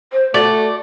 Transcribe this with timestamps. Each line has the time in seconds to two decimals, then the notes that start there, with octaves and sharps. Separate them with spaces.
0.13 C5
0.34 A3 F#4 D5